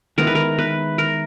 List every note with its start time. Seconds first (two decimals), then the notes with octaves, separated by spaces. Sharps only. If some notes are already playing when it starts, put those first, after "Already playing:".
0.18 D#3 G#3 B3 E4 A#4
0.27 B4
0.35 A#4
0.59 B4
0.98 A#4